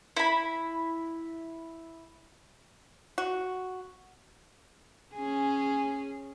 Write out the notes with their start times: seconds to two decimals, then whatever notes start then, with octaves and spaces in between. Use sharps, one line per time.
0.16 E4 B5
3.18 F#4
5.15 C#4 G#4